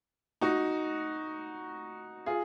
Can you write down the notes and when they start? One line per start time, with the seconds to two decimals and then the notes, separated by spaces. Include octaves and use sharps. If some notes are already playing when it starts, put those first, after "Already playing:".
0.41 D#4 F#4
2.26 F4 G#4